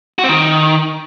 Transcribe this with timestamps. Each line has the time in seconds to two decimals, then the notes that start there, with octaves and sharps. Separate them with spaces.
0.19 F#4
0.24 C4
0.29 D#3